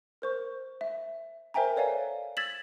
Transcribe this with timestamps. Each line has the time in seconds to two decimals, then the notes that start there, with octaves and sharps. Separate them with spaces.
0.22 A#4 C5 C#6
0.81 E5
1.54 A#4 C5 E5 G5 G#5 A#5
1.76 A4 B4 C#5 D5 F5 G#5
2.37 E6 G#6 A6 B6 E7 F#7